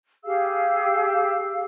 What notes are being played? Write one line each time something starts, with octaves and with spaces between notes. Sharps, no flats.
G4 G#4 F5 E6